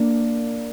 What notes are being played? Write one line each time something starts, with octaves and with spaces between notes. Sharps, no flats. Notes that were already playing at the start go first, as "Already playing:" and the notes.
Already playing: A#3 D4